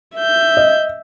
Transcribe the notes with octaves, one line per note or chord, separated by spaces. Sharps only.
E5 G6
D#5